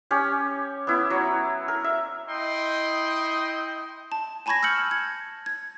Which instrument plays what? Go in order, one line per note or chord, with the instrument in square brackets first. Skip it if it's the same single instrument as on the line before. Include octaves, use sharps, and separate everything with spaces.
[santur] C#4 G4
B3 E4
F#3
A#4
E5
[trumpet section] E4 D#5 G5 C6
[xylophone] A5
G#5 A5 B5 C#6 G#6 A#6
E6 F6 G6 C#7 F#7
G#6
G#6